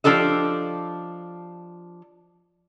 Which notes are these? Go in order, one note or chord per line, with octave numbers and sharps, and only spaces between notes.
F3 D4 G4 A4 D#5